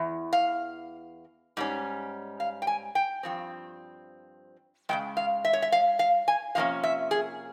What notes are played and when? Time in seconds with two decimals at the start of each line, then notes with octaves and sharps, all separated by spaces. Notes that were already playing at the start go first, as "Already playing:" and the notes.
Already playing: E2 E3
0.33 F5
1.57 G#2 G3 C#4
2.40 F5
2.62 G5
2.67 G#5
2.95 G5
3.23 G2 F3 C4
4.89 C#3 F3 G#3 G5
5.17 F5
5.45 E5
5.53 C#5
5.62 E5
5.72 F5
5.99 F5
6.28 G#5
6.55 C3 F3 A#3 C#4 F5
6.84 E5
7.11 G#4